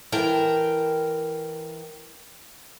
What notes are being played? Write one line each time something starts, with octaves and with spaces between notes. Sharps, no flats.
E3 A#4 G5 A5